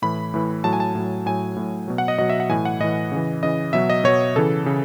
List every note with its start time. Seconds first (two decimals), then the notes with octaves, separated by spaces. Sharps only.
0.02 A2 E3 B5
0.34 A2 E3
0.64 A2 F#3 A5
0.73 G#5
0.80 A5
0.95 A2 F#3
1.26 A2 F#3 G#5
1.56 A2 F#3
1.88 B2 F#3
1.98 F#5
2.08 D#5
2.18 B2 F#3 D#5
2.29 E5
2.40 F#5
2.49 A2 E3 G#5
2.65 F#5
2.80 A2 E3 D#5
3.12 C#3 E3
3.43 C#3 E3 D#5
3.73 B2 F#3 E5
3.90 D#5
4.04 B2 F#3 C#5
4.36 C#3 E3 A4
4.66 C#3